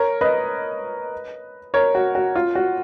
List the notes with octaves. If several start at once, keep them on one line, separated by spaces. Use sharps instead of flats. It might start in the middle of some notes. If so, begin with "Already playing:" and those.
Already playing: A#4 C#5
B4 D#5
A#4 C#5
F#4
F#4
F4
F#4